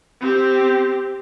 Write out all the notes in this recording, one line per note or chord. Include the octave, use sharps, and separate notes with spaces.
C4 G4